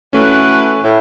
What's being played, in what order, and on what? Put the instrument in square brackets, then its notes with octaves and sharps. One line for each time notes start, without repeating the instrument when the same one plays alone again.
[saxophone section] E3 F#4 B4 [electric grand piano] A3 C#4
[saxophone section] A2